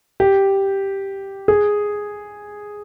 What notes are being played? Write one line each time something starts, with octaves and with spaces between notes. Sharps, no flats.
G4
G#4